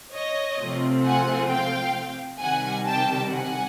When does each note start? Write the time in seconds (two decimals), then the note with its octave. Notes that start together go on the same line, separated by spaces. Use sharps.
0.13 C#5 D#5
0.59 C3 F3 A3 C4 F4
1.04 F#5 G#5
1.50 F5 G5
2.40 C3 D#3 G3 F#5 G#5
2.86 G5 A5
3.31 F#5 G#5